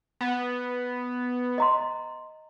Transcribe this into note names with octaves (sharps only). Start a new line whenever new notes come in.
B3
D#5 A#5 C6